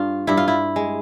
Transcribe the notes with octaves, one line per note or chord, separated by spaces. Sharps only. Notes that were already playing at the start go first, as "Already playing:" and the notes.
Already playing: G2 F4
G2 E4
F4
E4
G#3